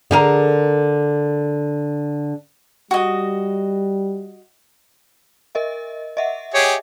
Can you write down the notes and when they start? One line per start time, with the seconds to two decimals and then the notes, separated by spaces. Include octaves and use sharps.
0.11 D3 G#4 A#4
2.91 G3 F#4 D#5
5.55 A#4 D#5 E5
6.17 D#5 E5 F#5
6.54 G4 G#4 C#5